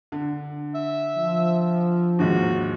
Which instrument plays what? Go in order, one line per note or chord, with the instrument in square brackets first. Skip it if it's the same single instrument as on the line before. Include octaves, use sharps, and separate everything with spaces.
[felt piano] D3
[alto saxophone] E5
[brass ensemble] F3
[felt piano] D#2 G#2 [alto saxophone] F#4